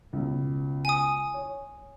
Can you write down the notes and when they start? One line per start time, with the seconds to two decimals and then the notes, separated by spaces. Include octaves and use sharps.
0.13 C#2 B2
0.85 G#5 D#6
1.34 C#5